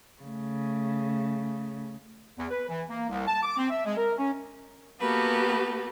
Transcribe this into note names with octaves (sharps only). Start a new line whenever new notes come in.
C#3 A3
E2
B4
E3
A#3
C2
A5
D6
C4
E5
G#3
A#4
C#4
A#3 B3 F#4 G4 A4 B4